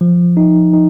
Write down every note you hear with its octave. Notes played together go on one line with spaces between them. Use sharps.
F3
D#4
D#4